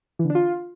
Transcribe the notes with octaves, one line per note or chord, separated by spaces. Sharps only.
E3
D3
D4
F4